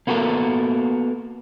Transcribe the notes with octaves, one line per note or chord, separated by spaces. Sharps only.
A#3 B3 F#4 A4 A#4